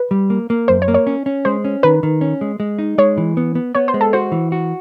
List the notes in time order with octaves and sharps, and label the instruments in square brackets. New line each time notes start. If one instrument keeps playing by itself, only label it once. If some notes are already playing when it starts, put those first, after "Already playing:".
Already playing: [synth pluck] B4
[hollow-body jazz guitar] G3
A#3
A#3
[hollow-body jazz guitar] F#2 [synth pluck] C5
[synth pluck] C#5
[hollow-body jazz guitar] A#3
[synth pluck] C#5
[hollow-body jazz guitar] C#4
C#4
[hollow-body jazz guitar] G#3 [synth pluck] C5
[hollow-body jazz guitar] C#4
[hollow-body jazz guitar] D#3 [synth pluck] B4
[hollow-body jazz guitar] D#3
C#4
G#3
G#3
D#4
[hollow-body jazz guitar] G#3 [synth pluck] C#5
[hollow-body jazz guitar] E3
B3
B3
[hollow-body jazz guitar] B3 [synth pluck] C#5
[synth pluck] C5
[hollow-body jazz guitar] G#3
[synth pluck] A4
[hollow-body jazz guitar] F#4 [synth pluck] C5
[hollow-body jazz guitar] E3
F#4